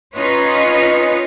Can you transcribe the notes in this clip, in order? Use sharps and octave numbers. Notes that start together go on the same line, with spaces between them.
C#4 D#4 F4 B4 C#5 D#5